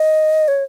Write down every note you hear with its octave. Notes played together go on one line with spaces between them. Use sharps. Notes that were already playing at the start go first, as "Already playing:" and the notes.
Already playing: D#5
C#5